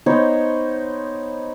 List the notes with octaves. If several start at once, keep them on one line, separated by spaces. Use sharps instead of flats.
B3 D#4 C5 C#5